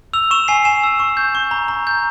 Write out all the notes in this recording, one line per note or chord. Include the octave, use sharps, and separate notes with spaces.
E6 F7
C#6 E7
G#5 C7
G#5 E7
E6
C#6
G6
C#6
A#5
A#5
G6